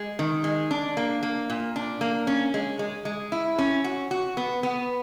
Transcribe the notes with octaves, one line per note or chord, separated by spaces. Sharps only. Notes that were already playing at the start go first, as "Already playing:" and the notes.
Already playing: G#3
D#3
G#3
D4
A#3
A#3
A#2
D4
A#3
C#4
G#3
G#3
G#3
E4
C#4
F#4
F#4
B3
B3